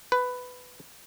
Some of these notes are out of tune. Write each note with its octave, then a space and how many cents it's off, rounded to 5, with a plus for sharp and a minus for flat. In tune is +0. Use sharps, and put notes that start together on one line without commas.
B4 +10